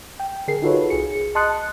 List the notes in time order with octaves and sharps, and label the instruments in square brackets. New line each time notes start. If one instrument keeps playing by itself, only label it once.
[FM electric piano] G5
D3 G#4 A#4 C7
D#4 F4 F#4 A4 B4 C#5
C2 G#4 C#7
D#5 A5 C6 D#6 F#6 C#7